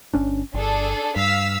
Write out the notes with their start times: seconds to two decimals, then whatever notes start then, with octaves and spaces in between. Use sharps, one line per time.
0.14 G1 C#4 D4
0.54 G1 D4 G#4 A4
1.16 G2 F5 E6 B6